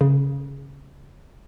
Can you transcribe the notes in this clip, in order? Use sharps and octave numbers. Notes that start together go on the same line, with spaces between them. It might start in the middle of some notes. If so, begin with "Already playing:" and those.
C#3